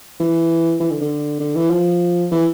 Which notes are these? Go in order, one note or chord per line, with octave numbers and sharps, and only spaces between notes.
E3
E3
D3
D3
D3
E3
F3
E3